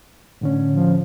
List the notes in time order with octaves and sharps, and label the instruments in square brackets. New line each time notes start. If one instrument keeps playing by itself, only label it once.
[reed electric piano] A2 D3 C#4
[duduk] F3